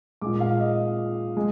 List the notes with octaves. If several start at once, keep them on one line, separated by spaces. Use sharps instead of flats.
A#2 G#3 D6
F5
D#5
G#3